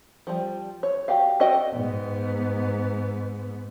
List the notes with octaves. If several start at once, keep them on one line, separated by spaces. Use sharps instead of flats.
F3 G3
C#5
F#4 G4 D5 F5
F#4 A4 D5 D#5 G5
G#2 B3